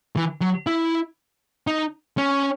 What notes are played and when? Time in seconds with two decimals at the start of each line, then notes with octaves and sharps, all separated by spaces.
0.16 E3
0.41 F#3
0.67 E4
1.67 D#4
2.18 C#4